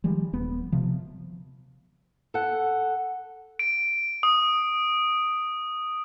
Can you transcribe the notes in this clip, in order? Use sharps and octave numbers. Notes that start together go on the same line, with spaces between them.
D#3 F3 G3 G#3
D#1 B3
C3 F3
A4 F#5
D7
D#6